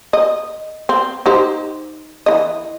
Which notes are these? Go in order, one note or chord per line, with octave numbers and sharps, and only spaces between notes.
D#5
C4
D#4 G4 C5
E3 D#5